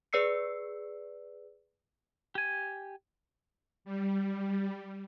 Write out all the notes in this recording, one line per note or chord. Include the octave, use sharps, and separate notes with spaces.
G#4 B4 D5 E6 C7 C#7
G4 G#5
G3